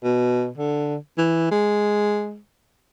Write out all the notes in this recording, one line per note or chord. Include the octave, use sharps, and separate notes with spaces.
B2
D3
E3
G#3